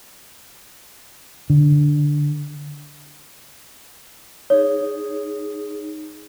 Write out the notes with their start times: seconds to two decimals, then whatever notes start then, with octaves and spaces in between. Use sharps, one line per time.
1.50 D3
4.50 D#4 G#4 C#5